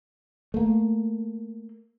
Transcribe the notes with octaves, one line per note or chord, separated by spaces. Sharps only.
A3 A#3